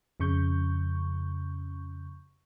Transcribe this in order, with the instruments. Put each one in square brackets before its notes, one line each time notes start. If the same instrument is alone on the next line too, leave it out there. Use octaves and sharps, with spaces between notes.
[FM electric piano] F2 C#3 C#6 G6